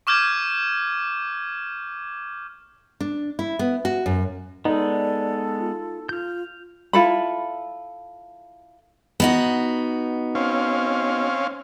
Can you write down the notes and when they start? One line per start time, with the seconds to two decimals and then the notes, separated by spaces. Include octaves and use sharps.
0.07 C#6 D6 F6 G6 G#6
3.01 D4
3.39 E4
3.59 B3
3.85 F#4
4.06 F#2
4.65 G#3 B3 D#4 A4 D5
5.60 F4
6.09 F4 F6 G6
6.93 E4 F4 A4 B5
9.20 B3 D#4 F#4
10.35 C4 C#4 F5